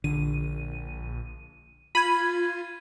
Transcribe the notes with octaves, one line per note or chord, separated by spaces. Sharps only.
A#1 D3 D#7
F4 B5 G#6 D#7